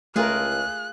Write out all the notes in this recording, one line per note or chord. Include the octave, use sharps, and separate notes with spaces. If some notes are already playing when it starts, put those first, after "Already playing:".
C#2 A3 F4 G#4 A#4 F#6